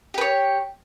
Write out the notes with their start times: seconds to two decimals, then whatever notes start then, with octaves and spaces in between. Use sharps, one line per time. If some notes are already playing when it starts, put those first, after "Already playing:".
0.14 G4
0.18 B4
0.21 C#5